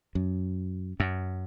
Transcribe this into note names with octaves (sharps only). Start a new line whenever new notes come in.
F#2
F#2